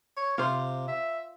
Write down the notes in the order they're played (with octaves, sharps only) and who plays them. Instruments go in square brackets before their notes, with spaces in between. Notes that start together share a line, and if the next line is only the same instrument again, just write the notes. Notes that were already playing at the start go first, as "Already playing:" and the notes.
[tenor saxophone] C#5
[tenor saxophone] C3 [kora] F4 C5
[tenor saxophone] E5